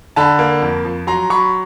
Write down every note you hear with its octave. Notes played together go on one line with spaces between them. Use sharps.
D3 A5 B5
A#3
F2
F3
F#3 A#5 C6
F#3 B5 C#6